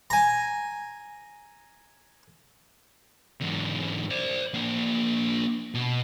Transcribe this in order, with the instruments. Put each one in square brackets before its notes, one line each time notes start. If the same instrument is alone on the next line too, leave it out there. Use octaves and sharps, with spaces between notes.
[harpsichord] G#5 A#5
[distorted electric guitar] E2 G#2
C5 D5
A#3 D4
B2